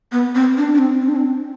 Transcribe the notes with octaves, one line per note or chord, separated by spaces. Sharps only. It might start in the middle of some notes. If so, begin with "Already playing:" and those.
B3
C4
D4
D4
C4
C4
D4
C4